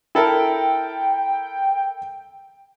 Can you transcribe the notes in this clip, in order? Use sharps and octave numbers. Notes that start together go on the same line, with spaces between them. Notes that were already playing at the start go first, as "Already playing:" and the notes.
E4 A4 A#4 G5